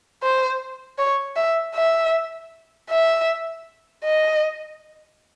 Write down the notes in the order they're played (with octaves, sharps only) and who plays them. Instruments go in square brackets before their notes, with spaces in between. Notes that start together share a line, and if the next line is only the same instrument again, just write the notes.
[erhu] C5
C#5
E5
E5
E5
D#5